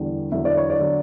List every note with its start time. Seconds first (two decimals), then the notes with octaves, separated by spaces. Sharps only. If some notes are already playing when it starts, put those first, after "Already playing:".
Already playing: E2 D3 G3
0.32 E2 D3 F#3 E5
0.45 D5
0.57 C#5
0.70 D5
0.80 D3 F#3